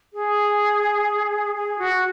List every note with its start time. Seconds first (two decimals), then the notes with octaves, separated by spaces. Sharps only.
0.13 G#4
1.54 G#4
1.78 F#4